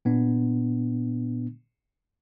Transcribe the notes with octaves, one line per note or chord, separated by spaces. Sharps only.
A#2 B3 D4